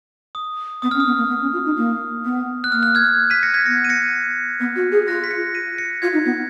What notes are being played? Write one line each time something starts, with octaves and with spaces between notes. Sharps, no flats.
D#6
B3 D#6
C#4 F6
D#6
B3
A#3
B3
C#4
F4
D#4
A#3
B3
F#6
A#3 F6
F#6
F6 G#6
B6 D#7
A#6 C#7
G#6 B6
B3 A#6 C#7
D#7
A#6 C#7
B3
F#4
G#4
F4 F#6 A#6
B6
A#6 C#7
B6 D#7
A#6 C#7
F4 G#6 B6
D#4
B3